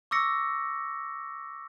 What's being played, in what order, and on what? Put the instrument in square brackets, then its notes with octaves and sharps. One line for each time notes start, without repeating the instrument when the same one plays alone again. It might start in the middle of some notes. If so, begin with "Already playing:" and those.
[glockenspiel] C#6 D6 E6 A#6 C#7